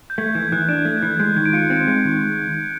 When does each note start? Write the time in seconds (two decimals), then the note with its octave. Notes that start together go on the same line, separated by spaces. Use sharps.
0.10 G6
0.18 A3 G#6
0.35 E3 G#6
0.52 E3 F#6
0.69 D4
0.85 A3
1.02 E3
1.10 G#6
1.19 G#3 G6
1.36 D#3 G#6
1.46 D7
1.53 F4 C#7
1.70 C4
1.88 G#3
2.05 D#3